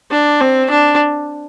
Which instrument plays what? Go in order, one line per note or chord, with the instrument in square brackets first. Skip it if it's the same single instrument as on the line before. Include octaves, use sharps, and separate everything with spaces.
[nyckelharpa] D4
C4
D4